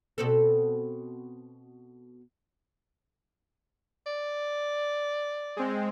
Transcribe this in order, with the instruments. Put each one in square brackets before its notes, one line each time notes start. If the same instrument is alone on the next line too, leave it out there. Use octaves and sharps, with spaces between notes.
[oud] B2 C4 A4
[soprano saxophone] D5
[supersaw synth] G#3 C4